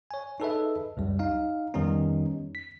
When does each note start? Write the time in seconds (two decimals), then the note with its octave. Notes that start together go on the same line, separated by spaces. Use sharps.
0.11 C#5 G#5
0.40 D#4 G#4 A4 B4 D#5 E5
0.97 C#2 F#2 G3
1.19 D#4 F5
1.74 F2 D#3 G3 B3 C#4 D#4
2.55 B6